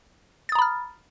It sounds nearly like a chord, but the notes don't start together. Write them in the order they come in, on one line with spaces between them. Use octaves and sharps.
A6 D#6 A#5 B5 F6